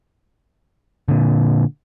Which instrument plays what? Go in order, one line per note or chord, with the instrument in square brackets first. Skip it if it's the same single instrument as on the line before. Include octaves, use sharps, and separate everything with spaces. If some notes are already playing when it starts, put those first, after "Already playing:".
[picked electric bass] A#2 D3